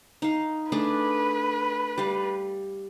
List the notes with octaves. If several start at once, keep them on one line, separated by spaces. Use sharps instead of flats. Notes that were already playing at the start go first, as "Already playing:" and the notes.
D#4 F5
A3 D4 G#4 B4
G3 F5